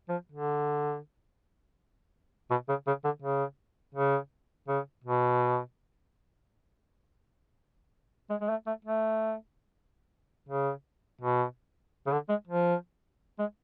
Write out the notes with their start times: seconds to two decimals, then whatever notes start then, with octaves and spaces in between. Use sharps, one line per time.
0.09 F3
0.32 D3
2.50 B2
2.69 C#3
2.87 C#3
3.04 D3
3.22 C#3
3.95 C#3
4.68 C#3
5.04 B2
8.30 G#3
8.41 G#3
8.49 A3
8.67 A3
8.85 A3
10.49 C#3
11.21 B2
12.06 C#3
12.12 D3
12.29 G#3
12.47 F3
13.39 G#3